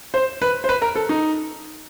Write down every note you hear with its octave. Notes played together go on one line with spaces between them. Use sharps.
C5
B4
C5
B4
A#4
A4
D#4